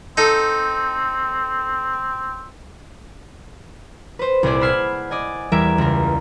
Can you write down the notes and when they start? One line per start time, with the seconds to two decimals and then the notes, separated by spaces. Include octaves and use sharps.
0.17 C4 D#4 A4
4.19 B4 C5
4.43 C2 A#2 E4 G#4 C5 D5
4.61 F#5 B5 E6 F6 G#6 C7
5.11 D5 D#5 G#5
5.52 E2 G3 A#4 E5 G#6 D7
5.78 C#2 A#4